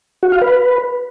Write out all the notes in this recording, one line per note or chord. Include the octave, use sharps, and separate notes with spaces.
F#4
F5
B4